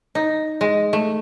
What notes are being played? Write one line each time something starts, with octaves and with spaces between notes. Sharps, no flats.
D#4
G#3
A3